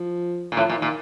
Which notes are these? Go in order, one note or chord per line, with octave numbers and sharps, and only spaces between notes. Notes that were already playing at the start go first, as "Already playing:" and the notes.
Already playing: F3
A#2
A2 F3
A#2
D#3
A#2